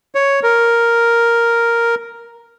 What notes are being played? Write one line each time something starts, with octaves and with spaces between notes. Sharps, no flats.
C#5
A#4